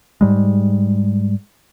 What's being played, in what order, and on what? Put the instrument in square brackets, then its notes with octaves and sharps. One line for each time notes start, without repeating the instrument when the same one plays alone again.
[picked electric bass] G#2 G3 G#3